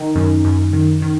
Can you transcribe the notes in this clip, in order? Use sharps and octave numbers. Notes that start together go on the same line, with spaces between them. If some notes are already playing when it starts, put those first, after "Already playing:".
Already playing: D#3 D#4
F#2
F#2
D#3
D#3